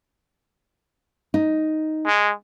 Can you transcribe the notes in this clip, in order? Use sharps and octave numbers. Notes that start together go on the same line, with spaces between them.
D#4
G#3